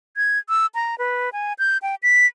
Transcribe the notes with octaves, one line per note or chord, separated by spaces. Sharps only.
G#6
E6
A#5
B4
G#5
G6
G5
B6